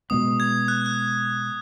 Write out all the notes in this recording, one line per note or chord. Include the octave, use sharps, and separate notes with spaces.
B2 G#3 B3 D#6
G#6
F#6
F#6